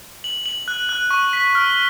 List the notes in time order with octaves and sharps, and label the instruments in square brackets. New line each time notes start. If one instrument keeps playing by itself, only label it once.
[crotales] F#7
F#7
F#6
F#6
C#6
B6
F6